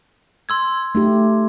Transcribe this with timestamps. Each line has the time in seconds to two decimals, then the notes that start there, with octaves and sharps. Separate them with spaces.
0.49 C6 E6 G#6
0.95 A3 D#4 G4